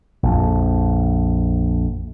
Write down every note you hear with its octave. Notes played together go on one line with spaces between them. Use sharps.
A#1 F2